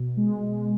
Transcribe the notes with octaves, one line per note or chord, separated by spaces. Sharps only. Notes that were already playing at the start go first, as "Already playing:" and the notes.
Already playing: B2
G#3
G#3